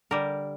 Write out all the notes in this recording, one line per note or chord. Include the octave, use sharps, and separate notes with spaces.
D3 G3 G4 A#4